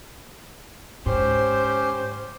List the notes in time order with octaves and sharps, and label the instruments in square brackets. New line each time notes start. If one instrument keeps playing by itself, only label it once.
[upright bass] G#2 [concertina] C#4 G4 C6 [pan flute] C5